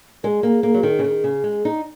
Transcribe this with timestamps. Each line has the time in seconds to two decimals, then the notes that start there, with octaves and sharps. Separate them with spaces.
0.23 G#3 G#4 A#4
0.43 A#3
0.63 A#3
0.74 F#3
0.83 D#3
0.99 C#3
1.04 D#3
1.24 C#3
1.44 G#3
1.65 D#4